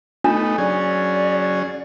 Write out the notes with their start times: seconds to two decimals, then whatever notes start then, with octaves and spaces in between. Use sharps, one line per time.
0.24 A3 B3 D4 D#4
0.58 F#3 C#4 G#4 D5